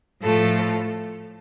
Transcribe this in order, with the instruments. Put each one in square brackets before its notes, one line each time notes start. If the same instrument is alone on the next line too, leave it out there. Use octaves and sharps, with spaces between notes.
[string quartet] A2 F3 A3 F4 A4